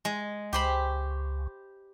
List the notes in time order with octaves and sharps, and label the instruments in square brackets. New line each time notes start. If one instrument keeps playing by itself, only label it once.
[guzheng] G#3
[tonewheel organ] C#2 [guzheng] G4 C5 B5